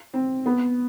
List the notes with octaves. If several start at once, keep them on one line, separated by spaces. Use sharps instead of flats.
C4
B3